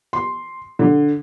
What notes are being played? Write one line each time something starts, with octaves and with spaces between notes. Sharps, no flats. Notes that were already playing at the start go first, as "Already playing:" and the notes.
C6
D3